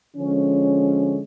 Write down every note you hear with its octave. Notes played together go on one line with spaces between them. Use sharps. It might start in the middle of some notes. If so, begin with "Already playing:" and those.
D3 F3 G#3 C#4